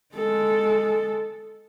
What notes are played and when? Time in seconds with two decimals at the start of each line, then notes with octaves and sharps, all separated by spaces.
0.15 G#3 A4